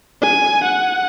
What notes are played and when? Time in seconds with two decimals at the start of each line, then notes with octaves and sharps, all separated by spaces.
0.22 G#5
0.64 F#5